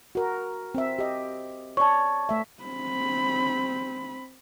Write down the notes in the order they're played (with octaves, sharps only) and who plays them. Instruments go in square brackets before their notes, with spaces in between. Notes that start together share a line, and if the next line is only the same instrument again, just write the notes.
[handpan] F#4 A#4
C4 E5
G4 D#5
[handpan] C#5 D5 [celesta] A5 C#6
[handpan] A3 E5
[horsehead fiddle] C4 B5